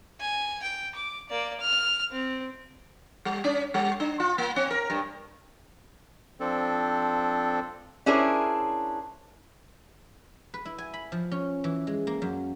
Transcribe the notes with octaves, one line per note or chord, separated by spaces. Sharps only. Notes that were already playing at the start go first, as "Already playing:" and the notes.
G#5
G5
D6
A#3 D5
F6
C4
G3
C#4
G3
D4
F4
A#3
C4
A#4
G2
F3 C4 D4 A4
C#4 D4 E4 G#4 A#4 C5
B4
E4
G#5
B5
F3
C#4
E3
G#3
A#3
F#2